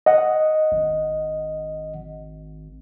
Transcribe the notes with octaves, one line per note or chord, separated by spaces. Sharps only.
D#5 F#5
G#1